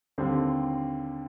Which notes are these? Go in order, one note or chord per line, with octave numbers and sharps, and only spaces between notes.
D#2 D3 G3 C4